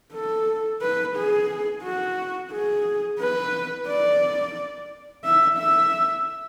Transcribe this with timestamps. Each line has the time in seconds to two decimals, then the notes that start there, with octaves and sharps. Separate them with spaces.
0.13 A4
0.82 B4
1.16 G#4
1.83 F#4
2.52 G#4
3.20 B4
3.88 D5
5.24 E5
5.58 E5